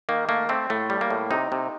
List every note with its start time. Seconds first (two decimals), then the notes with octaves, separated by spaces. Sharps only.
0.09 D#3 A#3
0.29 A3 A#3
0.49 A3 C4
0.70 A2 A3
0.90 G3
1.01 A#3
1.10 A2
1.31 C3 D#4
1.52 C3